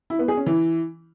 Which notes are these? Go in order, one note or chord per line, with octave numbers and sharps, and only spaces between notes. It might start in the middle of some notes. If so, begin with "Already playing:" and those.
E4
B3
G#4
C#4
E3